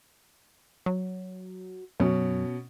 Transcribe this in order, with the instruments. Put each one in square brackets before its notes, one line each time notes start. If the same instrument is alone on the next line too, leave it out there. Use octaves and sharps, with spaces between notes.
[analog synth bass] F#3
[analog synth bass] F#2 [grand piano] B2 C#4